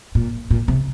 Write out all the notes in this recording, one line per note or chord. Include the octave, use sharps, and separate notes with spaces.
A#2
A#2
C3